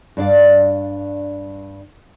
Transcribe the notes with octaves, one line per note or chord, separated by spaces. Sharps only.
G2 D4 D5 F5